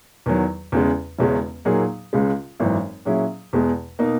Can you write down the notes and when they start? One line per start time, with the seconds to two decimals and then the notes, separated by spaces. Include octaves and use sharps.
0.26 E2 D#3 F#3
0.72 E2 C#3 G#3
1.19 E1 E2 C#3 G#3 C#4
1.65 A#2 F#3 A#3 D#4 G#4
2.13 C#2 C#3 G#3
2.60 G#1 F#2 E3
3.05 A#2 F#3 C#4 E4 G#4
3.53 E2 B2 G#3
3.99 B2 A#3 D#4